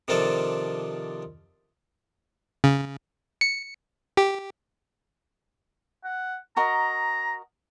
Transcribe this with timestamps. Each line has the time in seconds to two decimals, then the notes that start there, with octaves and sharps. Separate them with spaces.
0.08 C3 D#3 F3 D4 A4
2.64 C#3
3.41 C#7
4.17 G4
6.04 F#5
6.57 F#4 A#4 D#5 A#5